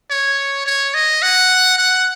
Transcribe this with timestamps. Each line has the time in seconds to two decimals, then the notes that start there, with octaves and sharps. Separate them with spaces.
0.10 C#5
0.66 C#5
0.94 D#5
1.22 F#5
1.78 F#5